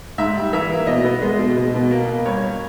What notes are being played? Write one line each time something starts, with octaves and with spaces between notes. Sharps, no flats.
G#2 E5
G3
E3 E5
A#3
B2 D#5
B3
G#3
B2
B2
B2
A#3
A#3
G2 C#5
A#3